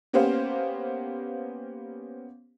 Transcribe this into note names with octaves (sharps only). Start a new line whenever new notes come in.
A#3 B3 C#4 G4 C5 F5